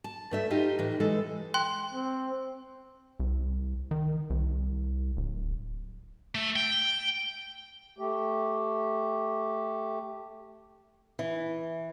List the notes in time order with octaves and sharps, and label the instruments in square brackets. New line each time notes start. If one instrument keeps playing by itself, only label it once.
[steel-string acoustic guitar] A5
G2 A3 E5
D#4 F4 G4
A2 E3
E3 G#3 A4
[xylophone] G5 C6 F#6
[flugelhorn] C4
[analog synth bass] C2
D#3
C2
D1
[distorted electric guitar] A3
G5
[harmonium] A3 G4
[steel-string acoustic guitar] E3